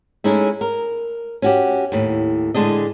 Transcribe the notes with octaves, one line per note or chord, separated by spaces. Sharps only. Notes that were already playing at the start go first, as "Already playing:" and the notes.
G#3 A3 C#4 D#4 E4
A#4
C#4 F#4 G4
D#2 A2
A2 D3 G#3 D4 D#5